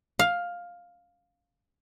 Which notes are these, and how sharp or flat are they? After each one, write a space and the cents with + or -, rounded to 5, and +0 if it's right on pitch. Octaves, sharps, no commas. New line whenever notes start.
F5 +10